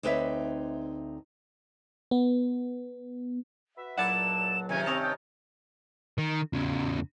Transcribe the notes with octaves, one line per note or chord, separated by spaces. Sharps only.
D2 C4 D#4 B4 C#5 E5
B3
F#4 B4 E5
C#2 A#2 F#3 E4 D5 F#5 A5 E7
C3 D#3 C#4 G#5
G2 C4 C#5 D#5 A5 F7
G5
D#3
E2 C#3